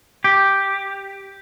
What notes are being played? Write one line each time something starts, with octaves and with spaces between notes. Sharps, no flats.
G4